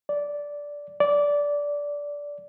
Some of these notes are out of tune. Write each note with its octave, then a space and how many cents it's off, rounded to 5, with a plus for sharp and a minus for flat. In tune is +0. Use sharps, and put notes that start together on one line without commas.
D5 -10
D5 -15